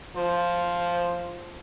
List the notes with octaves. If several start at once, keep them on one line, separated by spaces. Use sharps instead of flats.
F3 C5